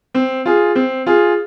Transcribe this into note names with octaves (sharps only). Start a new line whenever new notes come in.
C4
F4 G#4
C4
F4 G#4